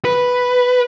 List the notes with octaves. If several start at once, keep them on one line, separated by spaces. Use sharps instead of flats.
B4